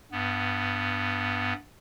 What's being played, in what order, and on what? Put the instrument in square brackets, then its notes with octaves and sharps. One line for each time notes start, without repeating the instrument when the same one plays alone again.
[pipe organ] G2 B3